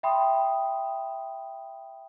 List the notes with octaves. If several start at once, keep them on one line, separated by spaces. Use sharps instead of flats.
E5 G5 B5 C6 D#6